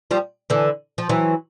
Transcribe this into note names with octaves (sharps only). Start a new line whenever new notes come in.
F3 G3
D3 E3
F3
E3 F#3